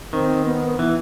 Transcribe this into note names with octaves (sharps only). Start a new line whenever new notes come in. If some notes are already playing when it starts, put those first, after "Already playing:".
D#3 C4
B3
E3